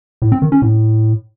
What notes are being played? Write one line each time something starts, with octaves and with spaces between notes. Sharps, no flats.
A2
C4
D#3
C#4
A2